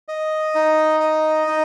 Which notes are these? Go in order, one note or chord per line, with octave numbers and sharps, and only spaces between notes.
D#5
D#4
D#5
D#4